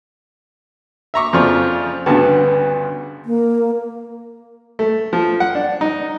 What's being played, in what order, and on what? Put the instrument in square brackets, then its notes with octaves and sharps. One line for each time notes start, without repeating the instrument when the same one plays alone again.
[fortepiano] E5 A#5 C#6 D6
F2 C#3 F3 D5 C#6
D2 G2 C#3 B3 F#4 A5
[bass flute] A#3
[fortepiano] A3
F3
F#5
D4
D#4